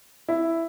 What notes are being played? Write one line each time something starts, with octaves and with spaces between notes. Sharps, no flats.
E4